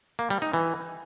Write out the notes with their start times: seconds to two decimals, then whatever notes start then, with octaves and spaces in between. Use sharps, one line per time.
0.19 A#3
0.30 G3
0.42 D#4
0.53 E3